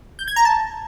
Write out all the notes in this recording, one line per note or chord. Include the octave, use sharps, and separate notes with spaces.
G6
G#6
A#5
A5